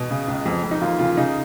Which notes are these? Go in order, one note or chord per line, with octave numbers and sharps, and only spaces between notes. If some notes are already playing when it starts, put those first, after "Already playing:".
Already playing: B2
C#3
C#2
F2
F2
D#4
D#2 F4
C#3 F4
C#3 D#4